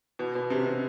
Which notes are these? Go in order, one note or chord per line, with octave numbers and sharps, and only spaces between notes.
B2
B2
C3
C3